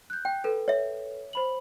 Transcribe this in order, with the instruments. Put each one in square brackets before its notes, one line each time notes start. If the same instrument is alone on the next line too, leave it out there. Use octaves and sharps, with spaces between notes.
[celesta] F#6 G6
[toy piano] G5
[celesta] A4 B4
[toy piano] C#5 E5
[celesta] C5 B5 F#7